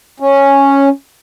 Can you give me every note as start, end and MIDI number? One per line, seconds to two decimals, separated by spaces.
0.20 0.89 61